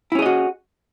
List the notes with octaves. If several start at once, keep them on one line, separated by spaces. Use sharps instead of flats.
C#4 E4 F#4 G#4 D#5